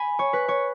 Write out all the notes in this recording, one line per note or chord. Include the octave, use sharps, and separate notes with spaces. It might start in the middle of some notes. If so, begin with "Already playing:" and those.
Already playing: G#5 B5
C#5
B4
C#5